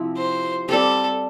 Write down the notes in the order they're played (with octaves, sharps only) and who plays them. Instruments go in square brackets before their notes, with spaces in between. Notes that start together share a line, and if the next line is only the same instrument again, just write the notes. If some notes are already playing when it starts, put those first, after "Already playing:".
Already playing: [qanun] C3 F3 C4 E4
[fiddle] C5
[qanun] G3 C4 G4 [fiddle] A4